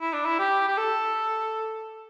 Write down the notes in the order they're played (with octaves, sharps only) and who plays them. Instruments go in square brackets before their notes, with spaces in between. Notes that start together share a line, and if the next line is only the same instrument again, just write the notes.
[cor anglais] E4
D4
E4
G4
G4
A4